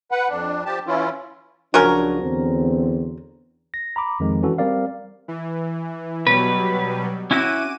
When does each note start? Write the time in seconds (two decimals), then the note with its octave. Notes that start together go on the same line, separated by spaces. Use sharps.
0.12 B4 F#5
0.29 F2 D4
0.65 F3 G4 A5
0.87 E3 C#4 E4 F4
1.74 C#2 F3 F#3 C#4 D4 A#4
2.22 E2 D3 C4
3.74 A#6
3.96 A#5 B5 D6
4.20 F2 D#3 G#3
4.43 E3 C#4 F#4 A4
4.58 G3 C4 A#4 D5 F5
5.28 E3
6.27 B2 F#3 G3 B4
7.31 C#4 E4 F#4 D6 D#7